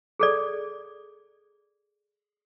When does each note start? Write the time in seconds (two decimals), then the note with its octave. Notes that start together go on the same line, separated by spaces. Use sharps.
0.19 G#4 A4 D5